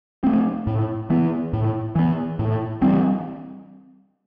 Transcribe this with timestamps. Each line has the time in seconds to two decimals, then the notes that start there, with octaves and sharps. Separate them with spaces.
0.24 A3 C4
0.67 A2
1.10 E3 B3
1.53 A2
1.95 E3 B3
2.39 A2
2.82 E3 G3 C4